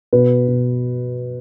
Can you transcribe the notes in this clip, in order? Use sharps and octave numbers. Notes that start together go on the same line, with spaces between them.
B2 B4
B2